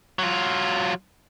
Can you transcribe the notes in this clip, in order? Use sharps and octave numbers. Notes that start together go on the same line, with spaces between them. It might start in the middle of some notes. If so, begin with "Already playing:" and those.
F#3 F4